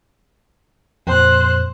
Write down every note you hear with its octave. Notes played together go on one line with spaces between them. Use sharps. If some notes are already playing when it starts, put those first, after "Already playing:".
F2 A#2 C5 F#6